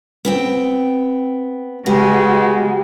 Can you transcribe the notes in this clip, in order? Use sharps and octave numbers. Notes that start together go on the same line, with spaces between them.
B3 C4 G5
C#3 G#3 B3 F#4 G4